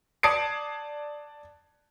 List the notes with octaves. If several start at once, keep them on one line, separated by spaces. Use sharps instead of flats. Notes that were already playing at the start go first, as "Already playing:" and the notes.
D5 A5 D#6 G#6 C7 D7